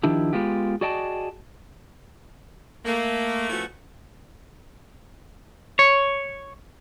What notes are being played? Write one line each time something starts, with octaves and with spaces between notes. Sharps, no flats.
D#3 F3 D4 E4 G4
G#3 B3 F4 G4
F#4 G#4 D5 D#5 G5 A5
A3 A#3
F3 A3 B3 C#4 E4 F#4
C#5